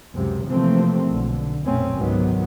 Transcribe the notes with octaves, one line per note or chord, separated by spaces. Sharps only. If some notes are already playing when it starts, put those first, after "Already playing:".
C#2 F#2 C3
C3 E3 F3 A3 A#3 C4
B1 D3
B1 F#2 A#2 A3 C4 C#4
G#1 C#2 C3 D#3 F#3 B3